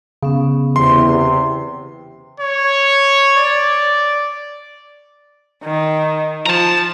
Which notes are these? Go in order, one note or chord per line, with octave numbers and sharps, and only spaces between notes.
C#3 B3 C#4
E2 C3 C6
C#5
D5
D#3
F3 A5 A#5